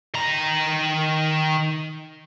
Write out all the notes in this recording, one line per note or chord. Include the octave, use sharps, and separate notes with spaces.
D#3 A#5